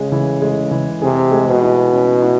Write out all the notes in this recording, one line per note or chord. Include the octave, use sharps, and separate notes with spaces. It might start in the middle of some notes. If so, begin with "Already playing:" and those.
Already playing: C#3 G#3
E3
G#3
E3
C3 G#4
G#3
B2
E4
C#4
E4